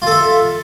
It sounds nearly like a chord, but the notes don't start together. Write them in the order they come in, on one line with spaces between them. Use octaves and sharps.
F4 A4 E5